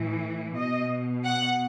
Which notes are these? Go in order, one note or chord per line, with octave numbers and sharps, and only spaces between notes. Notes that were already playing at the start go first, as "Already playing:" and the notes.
Already playing: A2 E3
B2 D#5
F#5